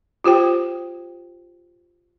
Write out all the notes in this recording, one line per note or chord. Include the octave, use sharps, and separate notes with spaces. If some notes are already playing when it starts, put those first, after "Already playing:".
F4 G4 C5 G5